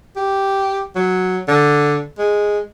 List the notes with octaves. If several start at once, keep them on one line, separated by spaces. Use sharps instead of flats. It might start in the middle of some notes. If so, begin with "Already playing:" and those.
G4
F#3
D3
G#3